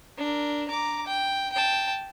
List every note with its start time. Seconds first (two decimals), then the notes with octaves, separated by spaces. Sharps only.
0.18 D4 A#4
0.68 A#5 D6
1.07 G5
1.53 G5 A5